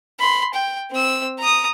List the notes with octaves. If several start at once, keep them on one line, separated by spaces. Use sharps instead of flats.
B5 C6
G5
C4 E6
A#5 D#6